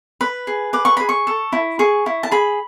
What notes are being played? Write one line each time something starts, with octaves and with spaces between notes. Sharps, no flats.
B4 B5
G#4
B4 D6
C#6
G#4 B5
C#6
A4
E4
G#4 C#6
E4
A5
G#4 B5